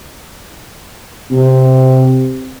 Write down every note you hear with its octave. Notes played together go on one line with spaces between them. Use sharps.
C3